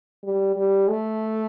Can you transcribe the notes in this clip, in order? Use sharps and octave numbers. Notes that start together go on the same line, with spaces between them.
G3
G3
A3